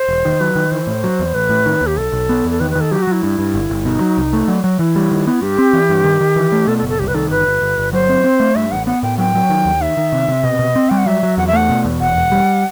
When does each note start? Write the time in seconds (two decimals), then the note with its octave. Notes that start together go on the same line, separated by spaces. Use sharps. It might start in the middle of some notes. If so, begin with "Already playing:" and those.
Already playing: C5
0.09 E1
0.25 D#3
0.40 F#3 B4
0.56 D#3
0.71 E3 C5
0.87 A2
1.04 F#3
1.19 E2
1.34 A1 B4
1.50 A2
1.66 D#3
1.81 D#2
1.87 G4
1.97 B1 A4
2.12 B1
2.29 B3
2.44 E2
2.51 A4
2.60 D#3 B4
2.71 D#3 B4
2.81 A4
2.91 F#3 G4
3.02 F#4
3.07 F#3 E4
3.23 G2
3.39 G2
3.54 G1
3.70 G1
3.85 B2 D#4
4.01 F#3
4.17 C2
4.33 A3
4.48 F#3
4.64 F#3
4.79 E3 E4
4.96 G3
5.11 D#3
5.27 B3
5.42 G2 G4
5.58 C4
5.73 E3
5.89 G2
6.04 D#3
6.21 D#3
6.36 E3
6.52 A3
6.67 B2 A4
6.78 A4
6.83 F#1
6.89 A4
6.99 C2 G4
7.08 B4
7.14 D#3 A4
7.30 G1 B4
7.47 G1
7.62 G1
7.78 G1
7.93 F#3 C5
8.09 C4
8.24 C4
8.40 A3
8.56 G2 E5
8.72 A1 F#5
8.87 B3 F#5
9.02 A2 G5
9.18 F#3 G5
9.35 F#3
9.49 D#3
9.65 D#2
9.81 D#3 E5
9.97 D#3
10.13 C3
10.28 C3
10.44 B2 D#5
10.59 B2
10.75 C4
10.90 G3 G5
10.98 F#5
11.06 F#3 E5
11.23 F#3
11.37 E2 F#5
11.47 E5
11.53 A3 F#5
11.69 B2
11.85 E2
12.00 E1 F#5
12.16 E1
12.32 G3